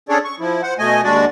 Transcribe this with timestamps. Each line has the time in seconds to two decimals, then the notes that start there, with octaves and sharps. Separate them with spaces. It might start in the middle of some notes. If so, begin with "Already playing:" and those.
0.09 C#4 D4 G#4 A4 C#5 D5
0.24 C#6
0.40 F3 E4
0.62 C5 F#5
0.79 B2 A3 D#5 G#5
1.04 D#2 G#3 D4 F#4 D5